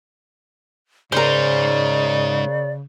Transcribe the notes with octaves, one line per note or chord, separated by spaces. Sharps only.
C#3 G#3 D#4 A#4 C5 D5